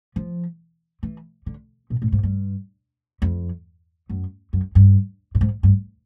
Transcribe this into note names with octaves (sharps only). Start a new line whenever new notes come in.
F3
E3
D3
A#2
A2
G#2
G2
F2
F#2
F#2
G2
A2
G#2
G2